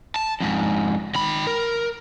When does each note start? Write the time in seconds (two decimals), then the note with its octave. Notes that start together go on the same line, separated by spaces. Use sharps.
0.16 A5
0.40 F2 G#2
1.15 D#3 B5
1.47 A#4